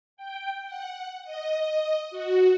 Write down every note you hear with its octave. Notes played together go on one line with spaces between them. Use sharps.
G5
F#5
D#5
F#4